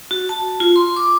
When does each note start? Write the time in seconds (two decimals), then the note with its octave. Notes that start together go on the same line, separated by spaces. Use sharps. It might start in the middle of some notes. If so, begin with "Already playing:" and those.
0.11 F#4
0.29 A5
0.60 F4
0.76 C6
0.96 D6